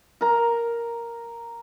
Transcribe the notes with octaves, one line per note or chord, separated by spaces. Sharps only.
A#4 A#5